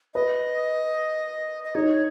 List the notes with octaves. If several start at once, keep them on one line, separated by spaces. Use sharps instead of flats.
B4 D#5
D#5
D#4 C#5